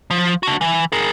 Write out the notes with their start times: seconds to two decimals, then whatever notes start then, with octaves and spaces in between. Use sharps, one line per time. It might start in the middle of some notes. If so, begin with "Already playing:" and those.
0.11 F3
0.43 D4 F#4
0.61 E3
0.92 G#4 A#4